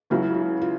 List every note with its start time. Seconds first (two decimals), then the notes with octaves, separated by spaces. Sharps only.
0.10 C#2 C#3 F#3 E4
0.36 E4
0.61 F4